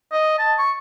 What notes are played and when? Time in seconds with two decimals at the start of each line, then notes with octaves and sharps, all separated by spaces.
0.12 D#5
0.39 A5
0.59 C#6